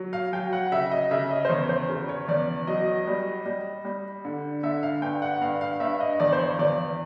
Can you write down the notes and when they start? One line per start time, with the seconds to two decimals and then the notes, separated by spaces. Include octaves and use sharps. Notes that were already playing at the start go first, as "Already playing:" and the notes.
Already playing: F#3
0.13 F5
0.32 F#3 G5
0.53 F#5
0.72 C#3 E5
0.91 D#5
1.11 C#3 E5
1.31 D#5
1.45 C5
1.50 E2 C#5
1.69 C5
1.89 C#3
2.09 C#5
2.28 E2 D5
2.67 F#3 D#5
3.07 G3
3.46 G3
3.85 G3
4.25 D3
4.63 D3 E5
4.83 F5
5.02 G2 G5
5.22 F#5
5.41 G2 F5
5.61 F5
5.80 G2 E5
6.00 D#5
6.20 E2 D5
6.32 C5
6.39 C#5
6.59 E2 D5